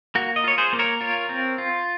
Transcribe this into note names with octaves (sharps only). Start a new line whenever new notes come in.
A#3 F#4
D#5
F4 C#5
G#4 C5
A#3
A#4 C#5
F4 A#4 C#5
C4
F4